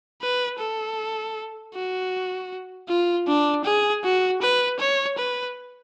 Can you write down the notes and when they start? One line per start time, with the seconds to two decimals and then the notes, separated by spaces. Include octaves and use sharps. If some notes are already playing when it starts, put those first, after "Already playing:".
0.22 B4
0.60 A4
1.74 F#4
2.89 F4
3.27 D4
3.65 G#4
4.04 F#4
4.41 B4
4.80 C#5
5.18 B4